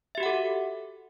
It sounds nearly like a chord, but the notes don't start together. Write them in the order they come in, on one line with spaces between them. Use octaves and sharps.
E5 G4 F#4 F#5 A4